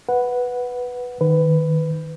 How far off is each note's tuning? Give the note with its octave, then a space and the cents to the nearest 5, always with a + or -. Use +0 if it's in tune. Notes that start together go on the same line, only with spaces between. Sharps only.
B4 +0 F#5 -5
D#3 +0 B4 +15